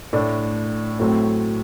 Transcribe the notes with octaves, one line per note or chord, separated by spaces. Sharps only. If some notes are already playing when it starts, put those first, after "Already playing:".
A2 A3 D4
A2 F#3 A3 C4